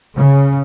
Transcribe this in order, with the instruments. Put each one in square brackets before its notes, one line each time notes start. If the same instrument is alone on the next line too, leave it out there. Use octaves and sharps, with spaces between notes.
[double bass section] C#3